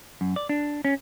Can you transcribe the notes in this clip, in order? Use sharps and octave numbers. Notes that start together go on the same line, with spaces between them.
F#2
D5
D4
C#4